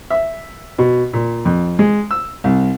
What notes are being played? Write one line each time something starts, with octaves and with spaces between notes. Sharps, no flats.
E5
B2
A#2
F2
G#3
E6
C2